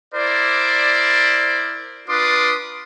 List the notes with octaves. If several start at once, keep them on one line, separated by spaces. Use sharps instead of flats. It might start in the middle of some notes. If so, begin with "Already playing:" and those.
E4 A#4 C5 D5
D4 F4 B4 C6 D6 D#6